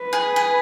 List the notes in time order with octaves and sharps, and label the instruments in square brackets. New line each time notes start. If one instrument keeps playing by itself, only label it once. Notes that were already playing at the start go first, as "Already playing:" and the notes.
Already playing: [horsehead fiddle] B4
[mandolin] G#4
G#4